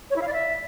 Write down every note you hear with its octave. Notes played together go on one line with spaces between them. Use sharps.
C#5
E4
F5
D5
E5